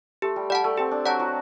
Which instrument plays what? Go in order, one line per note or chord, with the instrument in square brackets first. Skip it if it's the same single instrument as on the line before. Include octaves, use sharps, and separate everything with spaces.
[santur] A3 [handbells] G4
[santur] G3
[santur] G3 [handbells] D5 F#5 A5
[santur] A3
[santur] C4 [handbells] G4
[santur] D4
[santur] F#3 F#4 [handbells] D5 F#5 A5
[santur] F#3 F#4